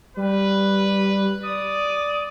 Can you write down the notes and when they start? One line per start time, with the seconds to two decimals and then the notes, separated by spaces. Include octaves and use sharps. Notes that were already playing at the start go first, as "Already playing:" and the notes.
0.17 G3 B4
1.43 D5 D#6